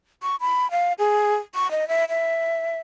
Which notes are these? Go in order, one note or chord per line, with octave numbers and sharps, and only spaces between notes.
C#6
B5
F5
G#4
C#6
D#5
E5
E5